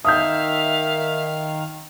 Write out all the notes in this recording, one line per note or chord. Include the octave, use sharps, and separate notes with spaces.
D#3 E5 F5 D#6 G6